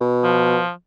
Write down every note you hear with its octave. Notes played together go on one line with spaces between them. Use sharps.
B2
F3